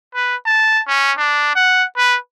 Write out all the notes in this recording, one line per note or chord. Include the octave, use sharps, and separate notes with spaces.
B4
A5
C#4
D4
F#5
B4